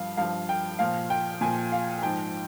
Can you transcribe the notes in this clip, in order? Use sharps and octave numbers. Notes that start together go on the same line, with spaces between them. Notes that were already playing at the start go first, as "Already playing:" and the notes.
Already playing: G2 F3 F5
G2 F3 F5
G5
A#2 F3 F5
G5
A#2 F3 G#5
F5
G#2 F3 G5